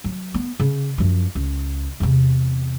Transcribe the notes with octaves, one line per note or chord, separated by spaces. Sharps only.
F#3
B3
C#3
F#2 F3
C#2
E2 C3